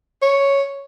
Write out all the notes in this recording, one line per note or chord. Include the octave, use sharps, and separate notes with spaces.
C#5